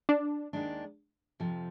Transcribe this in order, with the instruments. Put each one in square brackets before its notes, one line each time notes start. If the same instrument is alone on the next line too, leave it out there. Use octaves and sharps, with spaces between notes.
[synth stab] D4
[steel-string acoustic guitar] D#2 D#3 G#3 D4
F2 C3 F3